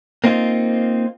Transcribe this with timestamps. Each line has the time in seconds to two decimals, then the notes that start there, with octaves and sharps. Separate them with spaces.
0.24 A#3 C4 D#4 F4